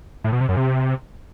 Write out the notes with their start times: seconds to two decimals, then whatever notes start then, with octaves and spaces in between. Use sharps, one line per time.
0.24 A2
0.33 B2
0.41 C3
0.49 F#2
0.57 C3